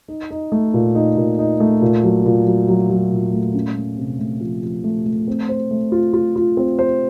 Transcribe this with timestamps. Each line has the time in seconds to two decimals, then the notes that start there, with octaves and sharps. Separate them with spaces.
0.08 D#4
0.30 D#4
0.52 A3
0.74 A#2
0.95 D#4
1.17 A#2
1.39 D#4
1.60 A3
1.82 A#2
2.03 F#3
2.25 A#2
2.46 F#3
2.68 F#3
2.90 F#3
3.12 A#2
3.33 A3
3.54 C#4
3.76 A3
3.98 C3
4.19 A3
4.41 F3
4.62 F3
4.84 A3
5.06 A3
5.28 C4
5.49 C5
5.71 A3
5.92 F4
6.13 F4
6.36 F4
6.57 C4
6.79 C5